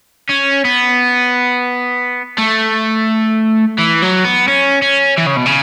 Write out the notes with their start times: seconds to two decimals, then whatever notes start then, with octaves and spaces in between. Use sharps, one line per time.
0.30 C#4
0.65 B3
2.39 A3
3.78 E3
4.02 F#3
4.24 B3
4.48 C#4
4.82 C#4
5.17 E3
5.26 C#3
5.36 B2
5.46 C#3